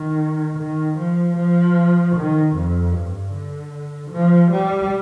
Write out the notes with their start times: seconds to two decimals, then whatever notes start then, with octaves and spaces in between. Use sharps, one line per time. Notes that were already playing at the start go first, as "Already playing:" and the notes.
Already playing: D#3
0.59 D#3
0.98 F3
1.38 F3
2.16 D#3
2.55 F2
2.94 G2
3.33 D3
4.11 F3
4.51 G3